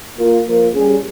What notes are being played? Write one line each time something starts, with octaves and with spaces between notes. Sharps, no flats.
A#3 F4 A#4
F3 A#3 F4 A#4
G3 C#4 G#4